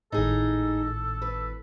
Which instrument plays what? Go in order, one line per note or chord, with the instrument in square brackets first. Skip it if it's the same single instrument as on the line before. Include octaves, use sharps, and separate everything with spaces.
[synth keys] G#1 A2 [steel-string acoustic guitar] D#4 G#4 [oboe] A4
[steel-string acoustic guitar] B4